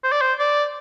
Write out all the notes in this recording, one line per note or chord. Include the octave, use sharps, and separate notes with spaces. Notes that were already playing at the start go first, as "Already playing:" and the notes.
C5
D5
C5
D5